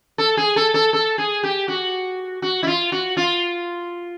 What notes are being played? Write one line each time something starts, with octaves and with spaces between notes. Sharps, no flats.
A4
G#4
A4
A4
A4
G#4
G4
F#4
F#4
E4
F4
F#4
F4